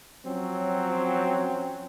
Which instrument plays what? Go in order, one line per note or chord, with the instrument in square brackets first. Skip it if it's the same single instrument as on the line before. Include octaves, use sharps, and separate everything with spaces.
[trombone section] F3 F#3 C4 C#4